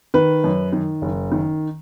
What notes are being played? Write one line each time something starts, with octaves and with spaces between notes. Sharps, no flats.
D#3 B4
F#2
D#3
F#1
D#3